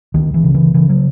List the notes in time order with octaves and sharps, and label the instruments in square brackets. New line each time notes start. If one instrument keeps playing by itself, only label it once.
[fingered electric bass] C#2 D#3
E3
C#3
E3
C#3 E3
F#3